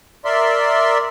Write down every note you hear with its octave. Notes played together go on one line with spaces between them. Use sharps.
A#4 D5 E5 C6